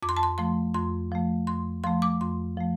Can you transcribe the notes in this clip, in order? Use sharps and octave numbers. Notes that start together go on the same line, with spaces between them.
F2 D6
C6
A5
C6
F3 A3 C6
F2 C6
F3 A3
F2 C6
F3 A3 C6
D6
F2 C6
F3 A3